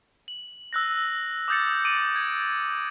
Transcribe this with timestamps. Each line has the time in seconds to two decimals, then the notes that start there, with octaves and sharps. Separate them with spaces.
0.28 F#7
0.73 E6 F#6 A#6
1.48 D6 D#6 G6 A6 C#7
1.85 D6 D7 D#7 F#7
2.16 G#6